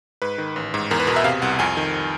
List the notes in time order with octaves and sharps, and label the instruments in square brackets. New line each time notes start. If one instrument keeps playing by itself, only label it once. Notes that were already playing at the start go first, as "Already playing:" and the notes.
[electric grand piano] G#2 B4
D#3
A1
G#2
E2 A#4
B4
B2 A#4
E5
C3 F5
C2 F#5
F2 G#5
D#3